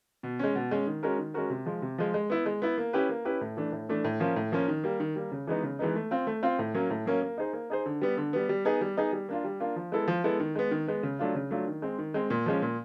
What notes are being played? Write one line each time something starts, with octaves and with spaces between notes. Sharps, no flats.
B2
G#3 C#4
B2
G#3 C#4
D#3
G#3 C#4 F#4 A#4
D#3
G#3 C#4 F#4 A#4
C3
F3 G#3
C3
F3 G#3
G#3
B3 E4
G#3
B3 E4
A#3
C#4 E4 G4 B4
A#3
C#4 E4 G4 B4
A2
E3 A3 D4
A2
E3 A3 D4
A2
F3 A#3 C#4
A2
F3 A#3 C#4
D#3
G3 A#3
D#3
G3 A#3
C#3
E3 G#3 B3 D#4
C#3
E3 G#3 B3 D#4
A3
C4 F4
A3
C4 F4
A2
F#3 A#3 C#4
A2
F#3 A#3 C#4
A#3
D#4 G#4 C5
A#3
D#4 G#4 C5
D3
G3 B3
D3
G3 B3
G3
B3 D#4 G#4
G3
B3 D#4 G#4
G3
A#3 D4 F4
G3
A#3 D4 F4
F3
G#3 B3 E4 A4
F3
G#3 B3 E4 A4
D#3
G#3 B3
D#3
G#3 B3
C#3
F#3 A3 D4 F4
C#3
F#3 A3 D4 F4
D#3
G#3 C4
D#3
G#3 C4
A#2
F3 G#3 C#4
A#2